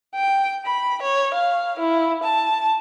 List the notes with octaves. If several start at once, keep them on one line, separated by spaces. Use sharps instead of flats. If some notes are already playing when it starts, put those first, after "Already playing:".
G5
B5
C#5
F5
E4
A5